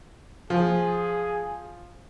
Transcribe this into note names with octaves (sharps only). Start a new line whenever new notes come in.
F3 G#4